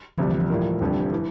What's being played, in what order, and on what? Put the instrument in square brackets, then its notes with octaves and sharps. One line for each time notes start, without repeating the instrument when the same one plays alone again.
[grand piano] D2 C3 G3 D4 [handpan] F3
[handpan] E3
F3
[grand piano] A2 G3 A#3
F1 F2 D3 G3
E3